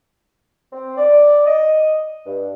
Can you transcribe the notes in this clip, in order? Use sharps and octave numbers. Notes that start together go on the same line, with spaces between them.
C4
D5
D#5
G2